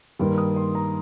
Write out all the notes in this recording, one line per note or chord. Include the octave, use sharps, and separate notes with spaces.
G2 D#3 G3 A#3 C6
D#6
C6
A#5